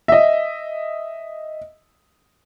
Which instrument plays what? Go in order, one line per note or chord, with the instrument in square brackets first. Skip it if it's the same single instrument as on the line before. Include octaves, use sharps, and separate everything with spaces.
[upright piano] D#5 E5